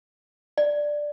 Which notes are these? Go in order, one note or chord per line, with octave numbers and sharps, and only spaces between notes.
D5